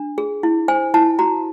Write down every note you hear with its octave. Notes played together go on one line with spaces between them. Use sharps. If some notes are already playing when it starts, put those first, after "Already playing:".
Already playing: D4
G#4
E4
C5 G#5
E4 A5
F#4 A#5